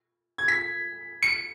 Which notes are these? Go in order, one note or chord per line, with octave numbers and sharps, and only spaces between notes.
G#6
B6
C#7